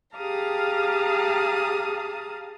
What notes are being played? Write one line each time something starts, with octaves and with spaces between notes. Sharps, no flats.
G4 G#4 F5 A5 A#5 D#6